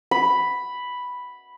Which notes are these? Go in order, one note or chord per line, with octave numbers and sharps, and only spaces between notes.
B5